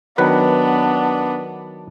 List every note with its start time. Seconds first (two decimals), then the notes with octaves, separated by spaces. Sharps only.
0.18 D#3 F#3 B3 D4 B4